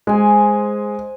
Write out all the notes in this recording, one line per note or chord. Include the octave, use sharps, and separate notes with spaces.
G#3 C5 G#5